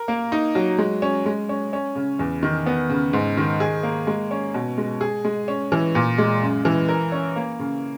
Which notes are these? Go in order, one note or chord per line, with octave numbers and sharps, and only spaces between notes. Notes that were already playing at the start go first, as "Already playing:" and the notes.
Already playing: A#4
A#3
D#4
F#3
G#3
C#4
G#3
C#4
C#4
C#3
E2
D#3
B3
C#3
G#2
D#3
G#4
A#3
G#3
C#4
B2
G#3
G#4
G#3
C#4
E3
A#2
G#3
F#2
E3
A#4
C#4
A#3
C#3